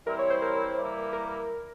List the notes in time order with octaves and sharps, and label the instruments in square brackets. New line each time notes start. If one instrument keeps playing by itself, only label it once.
[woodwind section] E3 G3 C4 E4 [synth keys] A#4
[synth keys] C#5
C5
A#4
[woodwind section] E3 G3 A#3 E4
[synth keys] A#4